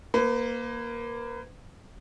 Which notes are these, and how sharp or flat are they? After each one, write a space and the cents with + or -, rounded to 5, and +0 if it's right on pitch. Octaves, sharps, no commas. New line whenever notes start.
A#3 +10 B4 +40